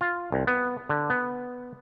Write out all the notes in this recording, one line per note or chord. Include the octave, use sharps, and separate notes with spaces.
F4
C2
B3
D3
B3